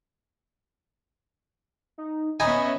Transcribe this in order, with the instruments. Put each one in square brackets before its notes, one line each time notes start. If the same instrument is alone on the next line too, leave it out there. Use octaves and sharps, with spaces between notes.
[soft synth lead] D#4
[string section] B3 C#4 E5 [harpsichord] D#4 G#5 [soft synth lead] B5